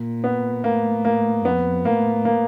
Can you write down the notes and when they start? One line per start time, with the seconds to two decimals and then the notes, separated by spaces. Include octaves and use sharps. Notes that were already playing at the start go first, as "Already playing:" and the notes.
Already playing: A#2
0.24 B3
0.64 A2 A#3
1.05 A#3
1.45 F2 B3
1.85 A2 A#3
2.25 A#3